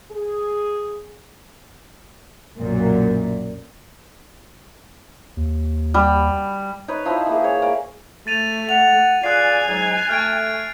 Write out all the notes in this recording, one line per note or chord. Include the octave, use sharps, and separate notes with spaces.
G#4
B1 F#2 A#2
D#2
G3
D#4 B4 C#5
F3 D#4 E4 C5
E3 A#3 G#4
C#5
A#3 D5
A3 A6 D#7 F7
F#5 F7
F4 G#4 D5 G#5 F#6 C7
G#2 F#3
A3 F6 G#6 D7